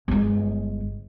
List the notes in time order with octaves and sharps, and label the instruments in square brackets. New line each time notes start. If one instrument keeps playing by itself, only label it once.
[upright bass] G1 G#3